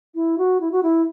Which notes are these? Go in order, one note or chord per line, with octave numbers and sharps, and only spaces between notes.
E4
F#4
E4
F#4
E4